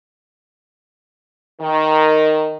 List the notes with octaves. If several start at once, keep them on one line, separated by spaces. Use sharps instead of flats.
D#3